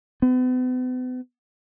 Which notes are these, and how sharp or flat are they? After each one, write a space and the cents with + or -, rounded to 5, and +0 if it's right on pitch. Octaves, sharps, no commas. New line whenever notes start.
B3 +40